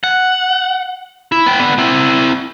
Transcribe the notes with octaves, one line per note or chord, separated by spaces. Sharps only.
F#5
E4
B3 G5
D3 B3
C4 E4